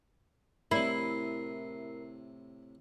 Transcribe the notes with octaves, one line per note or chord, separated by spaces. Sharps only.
A2 C3 E4 A#4 C7